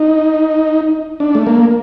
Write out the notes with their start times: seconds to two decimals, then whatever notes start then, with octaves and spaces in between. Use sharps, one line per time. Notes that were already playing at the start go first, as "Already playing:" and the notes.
Already playing: D#4
1.20 D4
1.35 A3
1.46 A#3